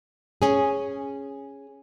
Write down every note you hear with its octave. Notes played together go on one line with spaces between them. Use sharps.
C#4 G#4